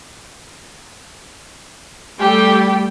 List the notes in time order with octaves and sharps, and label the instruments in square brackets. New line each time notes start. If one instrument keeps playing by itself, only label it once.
[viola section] G3 A3 G5 [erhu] G4